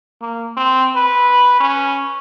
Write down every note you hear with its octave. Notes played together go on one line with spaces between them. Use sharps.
A#3
C4
B4
C#4